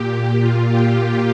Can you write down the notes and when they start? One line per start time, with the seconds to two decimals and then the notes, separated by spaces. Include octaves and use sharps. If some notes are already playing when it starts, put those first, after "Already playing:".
Already playing: A#2 G4
0.40 A#2 F4
0.68 G4